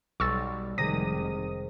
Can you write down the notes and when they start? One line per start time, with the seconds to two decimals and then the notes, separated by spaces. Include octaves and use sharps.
0.20 B1 G3 C#6 E6 A6
0.78 F1 C3 D#3 G#3 D#6 A#6